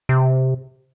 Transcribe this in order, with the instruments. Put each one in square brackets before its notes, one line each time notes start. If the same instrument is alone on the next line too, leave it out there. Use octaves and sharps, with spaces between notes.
[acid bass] C3